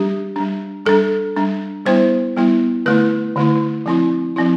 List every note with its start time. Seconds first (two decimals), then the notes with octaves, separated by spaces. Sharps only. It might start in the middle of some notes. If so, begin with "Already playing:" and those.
Already playing: G3 D4 G4
0.36 G3 D4
0.85 G3 D4 A4
1.36 G3 D4
1.86 G3 B3 E4 C5
2.36 G3 B3 E4
2.86 D3 A3 E4 B4
3.36 D3 A3 E4
3.86 F3 C4 E4
4.36 F3 C4 E4